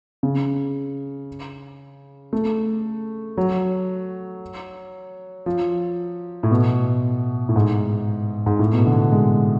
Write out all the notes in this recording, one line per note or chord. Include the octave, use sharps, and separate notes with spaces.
C#3
A3
F#3
F3
A2
B2
A2
G#2
G#2
A2
B2
D3
G#3